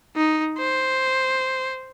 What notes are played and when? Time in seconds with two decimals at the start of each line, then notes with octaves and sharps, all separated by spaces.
0.16 D#4
0.58 C5